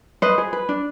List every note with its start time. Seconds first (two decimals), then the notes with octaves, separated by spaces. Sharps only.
0.22 B4 C5 D#5
0.38 G#4
0.53 B4
0.69 D4